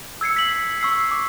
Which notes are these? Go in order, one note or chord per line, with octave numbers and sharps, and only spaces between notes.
E6 G#6 C7 C#7
B6 F#7
C#6 E6 C7
D6